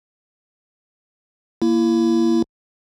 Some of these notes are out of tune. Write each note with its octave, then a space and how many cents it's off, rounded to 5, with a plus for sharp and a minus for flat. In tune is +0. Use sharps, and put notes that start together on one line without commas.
A#3 +0 E4 +25